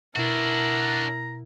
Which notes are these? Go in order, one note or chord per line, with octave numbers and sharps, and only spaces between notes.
B2 D4 E4 F#4 A#4 A#5